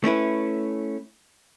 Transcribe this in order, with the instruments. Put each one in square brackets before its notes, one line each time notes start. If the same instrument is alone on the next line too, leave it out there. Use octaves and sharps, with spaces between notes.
[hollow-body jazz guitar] A3 C#4 E4 B4